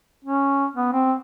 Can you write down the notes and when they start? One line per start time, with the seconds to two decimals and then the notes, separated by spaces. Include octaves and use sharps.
0.25 C#4
0.76 B3
0.93 C4